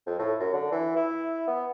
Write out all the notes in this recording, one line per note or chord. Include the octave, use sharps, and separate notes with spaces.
F2
A2
F#2
D3
E3
E4
B3